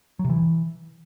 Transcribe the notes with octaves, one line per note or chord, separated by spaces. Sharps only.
F#3
C3
E3